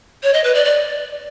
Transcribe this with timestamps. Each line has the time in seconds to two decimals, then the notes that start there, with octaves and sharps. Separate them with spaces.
0.23 C#5
0.34 D#5
0.44 B4
0.54 D5
0.65 D5